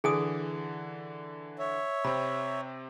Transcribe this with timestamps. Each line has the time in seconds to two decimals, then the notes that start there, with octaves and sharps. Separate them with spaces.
0.04 D3 E3 G#4 G#5 D#6
1.59 C#5 E5
2.04 C3 C4 B5